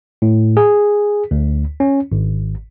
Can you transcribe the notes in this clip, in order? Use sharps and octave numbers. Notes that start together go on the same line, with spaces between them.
A2
G#4
D2
C#4
G#1